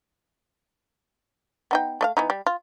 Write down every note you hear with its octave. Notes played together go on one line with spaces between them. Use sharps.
B3 D#4 G5
A3 D#5 F5
E3 B3 D#4
G3
F4